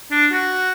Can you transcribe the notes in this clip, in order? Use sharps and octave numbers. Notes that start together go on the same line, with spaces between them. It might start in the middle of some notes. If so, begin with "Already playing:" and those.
D4
F#4